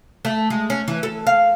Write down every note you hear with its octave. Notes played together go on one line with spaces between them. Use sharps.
A3
G#3
C#4
E3
A4
F5